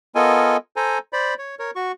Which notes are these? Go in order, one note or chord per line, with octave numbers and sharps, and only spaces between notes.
B3 F4 A4 A#4 D#5 G#5
A4 C5 G#5 A#5
C5 D5 B5
C#5
A#4 C#5
F#4 C#6